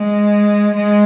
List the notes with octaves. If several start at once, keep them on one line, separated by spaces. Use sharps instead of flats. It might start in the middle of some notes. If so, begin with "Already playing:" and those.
Already playing: G#3
G#3